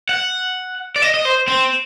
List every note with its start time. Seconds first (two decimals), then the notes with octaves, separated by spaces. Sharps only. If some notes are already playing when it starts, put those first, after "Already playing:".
0.09 F#5
0.96 D5
1.02 D#5
1.14 D#5
1.25 C5
1.48 C4